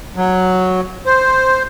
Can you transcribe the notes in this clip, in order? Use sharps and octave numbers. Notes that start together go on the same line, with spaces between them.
F#3
C5